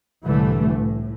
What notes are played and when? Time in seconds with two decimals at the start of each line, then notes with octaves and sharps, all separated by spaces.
0.24 C2 A2 D3 E3 A3
0.74 A2